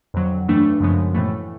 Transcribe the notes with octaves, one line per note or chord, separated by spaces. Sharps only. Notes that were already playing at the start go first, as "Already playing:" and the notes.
F2 D3 F#3
G2 E3 A3 D4
F#2 C#3 F3 G#3 B3
A2 E3 A3